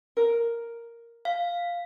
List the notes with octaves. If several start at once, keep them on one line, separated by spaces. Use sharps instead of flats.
A#4
F5